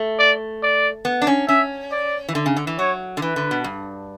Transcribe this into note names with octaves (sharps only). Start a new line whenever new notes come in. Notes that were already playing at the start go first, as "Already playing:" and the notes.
Already playing: A3
D5
D5
B3
D4
C#4
C#4 E5
D5
E3
D3
C#3
D3
E3
F#3 C#5
D3
E3 B4
D3
B2
G2